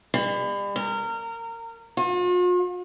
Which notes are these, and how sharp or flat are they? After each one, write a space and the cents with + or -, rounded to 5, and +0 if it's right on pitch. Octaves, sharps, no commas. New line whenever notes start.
G3 +40
A#4 -25
F4 +45